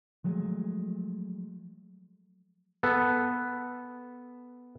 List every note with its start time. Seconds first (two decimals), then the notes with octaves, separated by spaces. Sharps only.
0.24 F3 F#3 G#3 A3
2.83 B3 A4